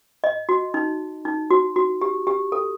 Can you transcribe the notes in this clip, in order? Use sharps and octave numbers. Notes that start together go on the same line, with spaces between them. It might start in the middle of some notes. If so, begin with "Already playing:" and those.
D#5
F#4
D#4
D#4
F#4
F#4
G4
G4
A4